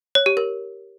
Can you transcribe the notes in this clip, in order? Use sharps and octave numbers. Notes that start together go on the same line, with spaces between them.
C#5
G4
A#4